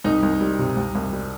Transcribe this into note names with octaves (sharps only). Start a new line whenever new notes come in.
C2 D#4
C2
G3
C3
C2
C2
G3